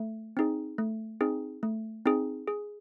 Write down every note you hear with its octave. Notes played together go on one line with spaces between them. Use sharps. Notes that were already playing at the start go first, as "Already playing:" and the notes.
Already playing: A3
C4 D#4 G#4
A3
C4 D#4 G#4
A3
C4 D#4 G#4
G#4